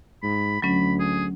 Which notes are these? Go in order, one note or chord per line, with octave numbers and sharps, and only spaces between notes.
G#2 B5
D2 F#3 C#4 B5
G#4